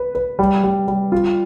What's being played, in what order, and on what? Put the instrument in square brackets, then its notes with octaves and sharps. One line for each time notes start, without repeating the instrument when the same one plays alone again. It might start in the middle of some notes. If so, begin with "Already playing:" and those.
Already playing: [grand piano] B4
B4
G3
G3
G3
F4